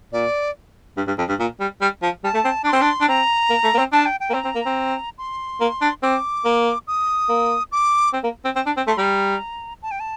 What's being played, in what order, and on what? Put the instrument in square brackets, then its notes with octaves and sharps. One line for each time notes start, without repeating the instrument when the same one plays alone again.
[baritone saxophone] A#2 [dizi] D5
[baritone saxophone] G2
G2
F2
G2
A#2
G3
G3
F3
[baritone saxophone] G3 [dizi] A5
[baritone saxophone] A3
C4
[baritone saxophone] D4 [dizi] D6
[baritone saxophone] C4 [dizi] C6
[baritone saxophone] D4
D4
[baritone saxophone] C4 [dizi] A#5
[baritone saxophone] A#3
A3
A#3
C4
[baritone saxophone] D4 [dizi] A5
[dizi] G5
G5
[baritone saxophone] A#3
[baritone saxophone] C4 [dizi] A#5
[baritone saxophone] C4
A#3
C4
[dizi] C6
[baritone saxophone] A#3
D4
[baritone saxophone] C4 [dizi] D6
[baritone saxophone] A#3
[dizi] D#6
[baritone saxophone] A#3
[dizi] D6
[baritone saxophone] C4
A#3
C4
C4
D4
C4
[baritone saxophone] A3 [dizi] C6
[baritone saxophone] G3 [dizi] A#5
[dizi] A5
G5
A5